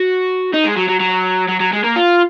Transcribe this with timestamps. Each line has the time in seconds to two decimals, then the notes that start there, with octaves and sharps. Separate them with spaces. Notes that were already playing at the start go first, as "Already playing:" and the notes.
Already playing: F#4
0.53 D#4
0.65 G#3
0.77 F#3
0.89 F#3
1.00 F#3
1.49 F#3
1.60 F#3
1.73 G#3
1.84 A#3
1.96 F4